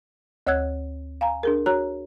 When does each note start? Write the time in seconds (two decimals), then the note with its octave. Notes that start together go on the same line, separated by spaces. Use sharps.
0.47 D2 C#5 F#5 E6 F#6 G#6
1.21 F5 G#5 A#5
1.43 D4 G#4 A#4
1.66 F#4 C#5 A#5 F#6